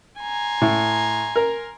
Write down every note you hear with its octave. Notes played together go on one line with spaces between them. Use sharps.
G#5 A#5 C6
A2
A#4